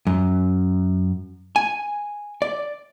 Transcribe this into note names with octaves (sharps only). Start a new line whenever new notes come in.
F#2
G#5
D5